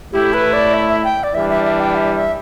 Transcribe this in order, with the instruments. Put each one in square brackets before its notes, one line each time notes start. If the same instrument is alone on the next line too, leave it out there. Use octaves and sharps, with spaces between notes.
[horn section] A2 A3 E4 [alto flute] G4
[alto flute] B4
D5
E5
E5
G5
D5
[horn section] E3 G3 D4 [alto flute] E5
[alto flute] E5
E5
G5
E5
E5